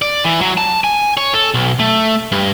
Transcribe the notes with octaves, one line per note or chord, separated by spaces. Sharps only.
D5
E3
F#3
A5
G#5
C#5
A4
B1
A3
G2